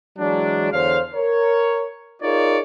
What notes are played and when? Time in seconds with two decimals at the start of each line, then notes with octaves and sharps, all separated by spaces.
0.18 E3 F#3 G#3 D4
0.72 E2 D3 C5 C#5 F5
1.14 A#4 C#5
2.22 D#4 F4 G#4 A#4 C#5 D5